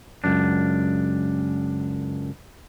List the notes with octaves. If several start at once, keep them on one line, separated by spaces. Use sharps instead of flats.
C#2 F#2 D4